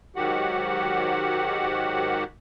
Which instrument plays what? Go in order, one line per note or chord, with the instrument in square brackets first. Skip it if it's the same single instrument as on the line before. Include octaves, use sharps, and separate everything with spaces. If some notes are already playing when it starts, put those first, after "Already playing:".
[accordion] G#2 D#3 F#3 F#4 G4 F#5